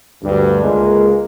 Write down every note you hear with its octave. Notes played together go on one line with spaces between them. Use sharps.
D2 G2
C#2 G#3 A#3